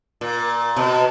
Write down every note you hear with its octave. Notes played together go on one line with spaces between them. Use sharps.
A#2
B2